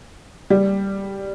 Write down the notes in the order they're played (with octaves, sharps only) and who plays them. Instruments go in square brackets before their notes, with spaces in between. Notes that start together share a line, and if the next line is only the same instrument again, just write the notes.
[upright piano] G3